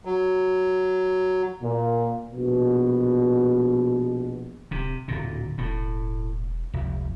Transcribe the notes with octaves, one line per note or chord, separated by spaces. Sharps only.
F#3
A#2
A#1 B2
D1 C3
D1 A#2 D3
E1 A2
F1 C#2